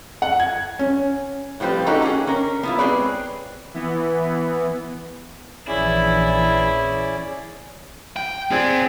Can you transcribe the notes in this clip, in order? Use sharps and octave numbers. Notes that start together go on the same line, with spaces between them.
F#5
G#6
C#4
A2 F3 G3 C4 B4
A#3 C#4 D#4 F#4 G4 A4
A#3 C#4 G#4
C#4 A#4
B3 E4 F4
G#3 C4 G#4 B4 C#5 D5
E3 B3
A#1 E3 C#4 E4 G#4 D5
G5
C4 F4 G#4 D5